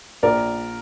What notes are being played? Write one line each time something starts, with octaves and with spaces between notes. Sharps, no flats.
A#1 A#4 D5